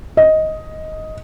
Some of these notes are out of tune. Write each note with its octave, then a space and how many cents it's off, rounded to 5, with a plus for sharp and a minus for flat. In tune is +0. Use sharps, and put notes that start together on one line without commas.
D#5 +10